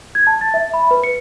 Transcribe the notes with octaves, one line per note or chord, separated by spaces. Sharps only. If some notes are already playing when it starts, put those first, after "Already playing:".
G#6
A5
A6
E5
B5
B4
C#7